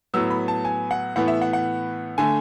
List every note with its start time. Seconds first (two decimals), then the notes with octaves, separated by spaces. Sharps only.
0.14 A2 F#3 B3 E6
0.30 B5
0.48 A5
0.65 G#5
0.91 F#5
1.16 A2 E3 B3 F#5
1.28 E5
1.42 F#5
1.53 F#5
2.18 D3 A3 G#5